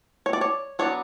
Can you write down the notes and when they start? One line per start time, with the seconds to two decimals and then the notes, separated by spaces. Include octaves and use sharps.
0.26 C#5
0.33 D5
0.41 C#5
0.79 F#3 B3 D4 C#5